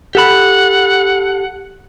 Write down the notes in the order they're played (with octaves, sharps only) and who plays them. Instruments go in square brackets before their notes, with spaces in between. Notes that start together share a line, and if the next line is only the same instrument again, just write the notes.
[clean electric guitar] G4 A4 B5 [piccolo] F#5